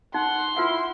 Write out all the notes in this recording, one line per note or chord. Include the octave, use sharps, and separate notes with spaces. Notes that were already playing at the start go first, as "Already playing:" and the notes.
D#4 F#5 C6
E4 F4 B4 F#5